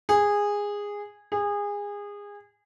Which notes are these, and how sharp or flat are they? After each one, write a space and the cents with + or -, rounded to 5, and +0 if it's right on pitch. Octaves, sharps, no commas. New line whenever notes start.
G#4 -15
G#4 -25